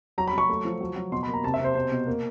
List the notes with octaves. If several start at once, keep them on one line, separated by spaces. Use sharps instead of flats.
F#3 A#5
B5
F#3 C#6
A3
F3
F#3
F#3
B2 C6
B5
A#3
A#5
C3 A5
E5
C3 C5
B2 C5
B2
A#3